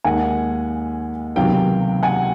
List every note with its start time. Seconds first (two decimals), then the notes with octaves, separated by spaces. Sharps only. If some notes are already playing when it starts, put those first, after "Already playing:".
0.04 D#2 D#3 G#3 F#5 G#5
1.36 C#2 C3 D#3 F#3 B3 F5 G5
2.03 F#5 G#5